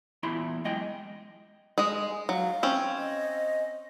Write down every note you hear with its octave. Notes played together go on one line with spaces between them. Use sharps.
E2 A#2 E4 B5 C6
F#2 G#3 D#5 G5
G#3 D#5
F#3 F5
C4 C#4
D#5